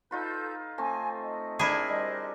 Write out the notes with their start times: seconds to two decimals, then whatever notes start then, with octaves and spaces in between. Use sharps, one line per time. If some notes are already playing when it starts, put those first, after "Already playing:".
0.11 D#4 F4 A4 B4 G6
0.78 A3 C4 G#5
1.21 D#5
1.59 D4 E4 G#4 A#4
1.88 G3 C5 D#5